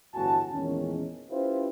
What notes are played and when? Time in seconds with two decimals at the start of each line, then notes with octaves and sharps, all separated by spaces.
0.14 G1 E2 A2 F#4 G#5 A5
0.52 E2 A#2 D#3 G#3 C#4
1.30 C#4 E4 F4 G4 B4 C5